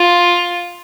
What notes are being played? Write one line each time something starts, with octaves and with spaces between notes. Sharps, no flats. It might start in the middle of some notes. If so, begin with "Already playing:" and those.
Already playing: F4